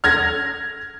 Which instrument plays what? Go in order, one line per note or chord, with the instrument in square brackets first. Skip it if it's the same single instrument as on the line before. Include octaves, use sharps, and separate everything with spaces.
[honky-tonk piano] F6 G#6 A#6